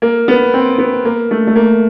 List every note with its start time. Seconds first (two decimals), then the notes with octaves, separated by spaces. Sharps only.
0.02 A#3
0.28 B3
0.54 C4
0.78 B3
1.05 A#3
1.31 A3
1.47 A3
1.56 A#3